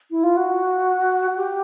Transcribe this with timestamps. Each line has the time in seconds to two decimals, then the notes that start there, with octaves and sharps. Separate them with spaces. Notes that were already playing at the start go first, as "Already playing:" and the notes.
0.10 E4
0.23 F4
0.36 F#4
1.36 G4